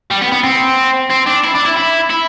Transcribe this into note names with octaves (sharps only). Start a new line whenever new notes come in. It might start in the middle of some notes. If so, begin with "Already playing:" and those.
G3
B3
B3
C4
C4
D4
E4
D4
E4
E4
E4